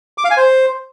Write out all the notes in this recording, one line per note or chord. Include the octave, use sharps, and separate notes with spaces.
D6
F5
G#5
C5